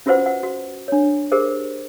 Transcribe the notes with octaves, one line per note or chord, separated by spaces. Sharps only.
C#4 F4 F#4 B4 C5 F#5
F#5
F#4
D4 C#5
G4 G#4 A#4 C5